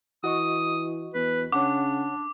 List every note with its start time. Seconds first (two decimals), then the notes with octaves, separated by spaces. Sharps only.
0.24 E3 F#4 D#5 C#6 D#6
1.14 E2 B4
1.52 C#3 D4 C#5 F#5 D6